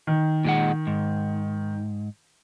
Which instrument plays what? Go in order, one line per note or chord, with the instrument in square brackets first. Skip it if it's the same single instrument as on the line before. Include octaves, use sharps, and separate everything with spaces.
[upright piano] D#3
[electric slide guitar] A#2 G#3 F#5
G#2